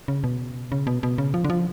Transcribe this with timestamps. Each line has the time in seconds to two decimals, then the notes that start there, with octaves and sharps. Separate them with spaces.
0.08 C#3
0.24 B2
0.72 C#3
0.87 B2
1.03 B2
1.18 C#3
1.34 F3
1.44 D3
1.50 F3